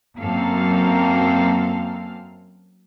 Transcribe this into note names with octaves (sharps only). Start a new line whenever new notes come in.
F#2 A#3 C4 A4 F5